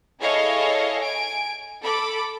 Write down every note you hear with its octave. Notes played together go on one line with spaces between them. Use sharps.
E4 G#4 A4 C#5 D#5 F5
G#5 D7
A4 B5 D6